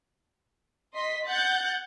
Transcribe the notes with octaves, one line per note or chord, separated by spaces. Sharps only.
D#5 C6 B6
F#5 F#6 G6 A6